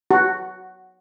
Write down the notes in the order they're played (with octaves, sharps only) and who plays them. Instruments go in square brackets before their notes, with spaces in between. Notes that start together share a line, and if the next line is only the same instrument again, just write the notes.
[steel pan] F#4